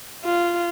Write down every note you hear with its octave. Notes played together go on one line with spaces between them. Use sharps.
F4